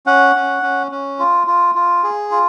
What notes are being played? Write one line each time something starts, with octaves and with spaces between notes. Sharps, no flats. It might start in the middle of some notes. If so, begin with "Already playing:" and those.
C#4 F#5
C#4
C#4
C#4
F4
F4
F4
G#4
F4